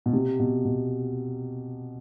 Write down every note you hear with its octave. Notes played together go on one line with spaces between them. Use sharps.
B2
C3
B2
B2